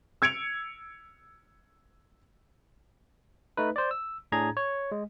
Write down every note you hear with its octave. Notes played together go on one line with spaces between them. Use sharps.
E6 G#6 C#7 D7 F7
A3 D#4 B4
C5 D5
E6
A2 D4 G#4 A#5 G#6
C#5
G#3